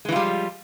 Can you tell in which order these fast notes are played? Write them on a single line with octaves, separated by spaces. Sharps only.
G#3 E3 F4 G3 F3